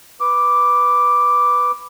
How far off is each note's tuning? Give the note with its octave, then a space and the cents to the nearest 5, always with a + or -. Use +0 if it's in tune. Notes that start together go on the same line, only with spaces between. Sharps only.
B4 +0 D6 +0